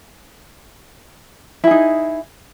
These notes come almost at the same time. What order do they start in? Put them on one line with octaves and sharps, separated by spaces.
E4 G#4 D#4